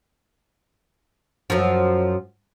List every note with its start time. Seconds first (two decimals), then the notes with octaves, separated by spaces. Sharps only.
1.50 F#2 F3